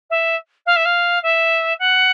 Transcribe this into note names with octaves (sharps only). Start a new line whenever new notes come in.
E5
F5
E5
F5
E5
F#5